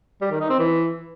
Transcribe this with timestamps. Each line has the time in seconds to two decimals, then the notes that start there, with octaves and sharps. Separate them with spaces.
0.21 G3
0.31 D#3
0.40 D#4
0.50 C4
0.59 E3